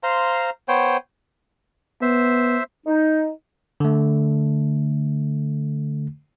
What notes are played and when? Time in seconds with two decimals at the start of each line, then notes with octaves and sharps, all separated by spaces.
0.03 C5 F5 A#5 C6
0.68 B3 C5 C#5 G5
2.02 B3 C5 E5
2.87 D#4
3.80 D3 A3